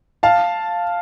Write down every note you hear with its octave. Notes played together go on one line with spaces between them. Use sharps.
F5 A5